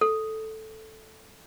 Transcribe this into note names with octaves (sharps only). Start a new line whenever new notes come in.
A4